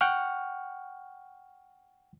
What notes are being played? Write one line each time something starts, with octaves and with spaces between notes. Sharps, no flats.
F#5 G5 C#6 F6